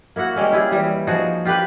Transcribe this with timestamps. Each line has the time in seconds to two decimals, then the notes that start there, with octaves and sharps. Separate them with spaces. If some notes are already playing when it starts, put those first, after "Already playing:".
0.16 A#3 E4 F#4 F#5
0.36 G3 G#3 C#4
0.53 E4 F4 G4 G#4
0.72 E3 G3
1.07 F3 D#4 F#4 G#4
1.45 F4 G4 A#4 B4